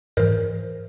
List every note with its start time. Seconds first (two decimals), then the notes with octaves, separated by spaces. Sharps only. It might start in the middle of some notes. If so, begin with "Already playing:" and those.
0.17 G#2 E3 A#4 C5